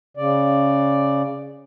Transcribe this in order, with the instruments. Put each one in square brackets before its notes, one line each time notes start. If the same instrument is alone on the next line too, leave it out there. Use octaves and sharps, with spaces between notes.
[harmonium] C#3 D5